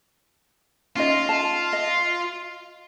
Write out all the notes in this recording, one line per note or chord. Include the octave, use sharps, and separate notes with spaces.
C#4 D#4 F4 D#5
A5
D#5